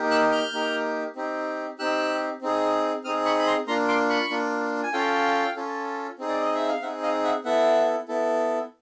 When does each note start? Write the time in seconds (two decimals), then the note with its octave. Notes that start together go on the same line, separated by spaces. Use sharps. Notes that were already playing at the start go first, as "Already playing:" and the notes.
Already playing: A#3 D#4 G4
0.11 E6 F#6
0.32 F6 G6
0.53 A#3 D#4 G4
1.16 C4 D#4 G4
1.78 C4 D#4 G4 E6 F#6
2.42 C4 D#4 G#4
3.04 C4 D#4 G#4 D#6 F6
3.25 B5 C#6
3.38 B5
3.46 A#5 C6
3.67 A#3 D4 F4 A#5 C6
3.88 C6 D6
4.09 B5 C#6
4.30 A#3 D4 F4
4.83 G#5
4.93 C#4 F4 A4 F5 G5
5.56 C#4 F4 A4
6.19 C4 D#4 G#4
6.28 D5
6.41 D#5
6.55 E5
6.68 F5
6.82 C4 D#4 G#4 E5 F#5
7.03 D#5 F5
7.24 E5 F#5
7.44 B3 E4 A4 E5 F#5
8.08 B3 E4 A4